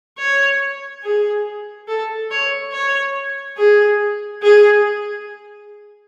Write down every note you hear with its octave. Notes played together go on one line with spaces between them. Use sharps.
C#5
G#4
A4
C#5
C#5
G#4
G#4